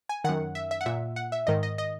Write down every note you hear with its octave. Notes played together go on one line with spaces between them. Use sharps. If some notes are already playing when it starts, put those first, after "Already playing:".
G#5
F#2 D#3 F#5
E5
E5
F#5
A#2 E5
F#5
E5
G#2 D#3 D#5
D#5
D#5